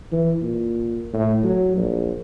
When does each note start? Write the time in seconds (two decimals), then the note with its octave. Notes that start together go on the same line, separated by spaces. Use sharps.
0.12 E3
0.42 A#2
1.13 A2
1.44 F#3
1.76 A#1